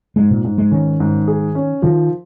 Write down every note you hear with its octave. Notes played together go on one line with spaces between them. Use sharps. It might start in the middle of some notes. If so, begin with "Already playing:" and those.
G#2 G#3
A#2
G#2
G#3
D#3 C#4
G#2
G#4
C#4
D#3 F3